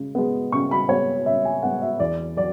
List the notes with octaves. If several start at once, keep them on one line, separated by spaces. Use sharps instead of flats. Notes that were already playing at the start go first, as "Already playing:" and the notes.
Already playing: C#3 G#3
G#3 B3
C#3 C#6
B5
G#3 B3 C#5
C#3 E5
G#5
G#3 B3 F#5
E5
E2 D5
F#3 D5